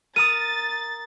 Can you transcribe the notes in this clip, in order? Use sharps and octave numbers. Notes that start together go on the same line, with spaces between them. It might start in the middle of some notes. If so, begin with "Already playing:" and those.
A#4 A#5 D#6 A6 D#7